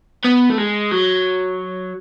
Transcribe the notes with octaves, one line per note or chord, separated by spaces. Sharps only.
B3
A3
G#3
F#3